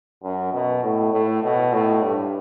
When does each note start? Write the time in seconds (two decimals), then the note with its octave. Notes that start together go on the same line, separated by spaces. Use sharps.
0.23 F#2
0.53 B2
0.83 A2
1.13 A2
1.43 B2
1.73 A2
2.03 G2